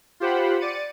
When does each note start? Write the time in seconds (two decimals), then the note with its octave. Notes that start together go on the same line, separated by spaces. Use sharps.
0.20 F4 G4 C5 F#5 B5
0.60 D5 A6 C#7 D#7